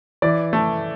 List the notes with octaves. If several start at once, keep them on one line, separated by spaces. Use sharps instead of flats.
E3 D5
A3